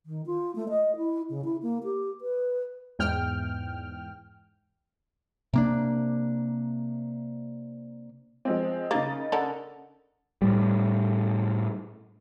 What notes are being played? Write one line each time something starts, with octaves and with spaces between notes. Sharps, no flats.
D#3
F4
A3
D#5
E4
C#3
E4
A#3
G4
B4
E2 G#2 G5 F6
C3 A#3 D4
F3 G#3 C4
C#3 A#3 D#4 A6
D3 A4 A#4
A2 G3